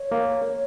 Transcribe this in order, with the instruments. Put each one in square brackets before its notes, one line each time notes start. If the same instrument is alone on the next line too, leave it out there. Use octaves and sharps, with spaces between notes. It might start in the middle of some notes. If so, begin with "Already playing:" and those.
Already playing: [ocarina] C#5
[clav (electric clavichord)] A#3